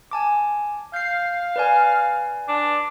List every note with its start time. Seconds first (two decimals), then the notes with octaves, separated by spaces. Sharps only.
0.11 G#5 A5 D6
0.94 F5 G6 C7
1.56 B4 D5 G#5
2.49 D4